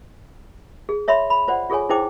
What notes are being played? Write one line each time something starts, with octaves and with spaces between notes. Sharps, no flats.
G#4
C#5 E5 B5 C6
B5
F4 C5 D5 F#5
F4 G#4 A4 C#5 G#5
D#4 E4 G#4 C5 G5 D6